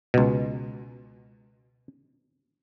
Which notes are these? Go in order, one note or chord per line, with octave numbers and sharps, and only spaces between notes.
C#2 B2